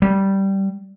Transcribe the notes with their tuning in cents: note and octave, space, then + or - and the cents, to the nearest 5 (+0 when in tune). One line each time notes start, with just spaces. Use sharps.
G3 -10